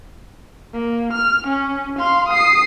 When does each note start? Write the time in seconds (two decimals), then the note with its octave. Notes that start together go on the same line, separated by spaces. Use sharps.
0.74 A#3
1.13 F6
1.47 C#4
1.99 F5 C6
2.29 D#6 C7